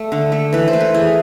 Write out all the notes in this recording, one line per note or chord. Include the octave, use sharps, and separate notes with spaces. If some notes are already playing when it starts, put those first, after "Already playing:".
Already playing: A3
D3
A3
E3 B4
C5
A3
B4
E3 G#4